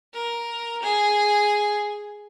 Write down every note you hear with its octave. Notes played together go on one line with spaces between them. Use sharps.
A#4
G#4